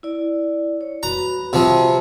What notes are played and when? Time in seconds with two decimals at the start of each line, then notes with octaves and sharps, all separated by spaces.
0.03 E4 D5
0.81 C#5
1.03 F#4 B4 A#5 B5
1.53 C3 F3